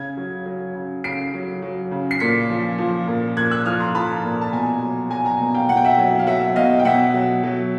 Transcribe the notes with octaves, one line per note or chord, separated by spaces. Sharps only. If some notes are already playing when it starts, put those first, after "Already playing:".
Already playing: C#3 G#6
F#3
F#3
C#3
C#3 C7 D7
F#3
F#3
C#3
C7
A#2 B6 C#7
F3
F3
A#2
A#2 F#6 G#6
E6 F#6
F3 D#6 F6
A#5 C6
F3 A5 B5
A#2
A5
B2 G#5 A#5
F#3
F#3 G#5 A#5
G#5 A#5
B2
F5 G5
B2 F#5
G5
E5 F#5
F#3
F5
F#3 E5 F#5
B2 D#5 F5
G5
B2 E5 F#5
F#3
F#3